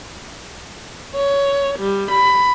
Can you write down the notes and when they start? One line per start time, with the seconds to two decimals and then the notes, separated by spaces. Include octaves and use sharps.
1.15 C#5
1.80 G3
2.11 B5